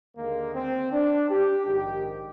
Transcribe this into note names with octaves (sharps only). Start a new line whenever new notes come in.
D#2 D3 G#3 A#3
C4
D4
G4
A#1 G#2 D#3 G4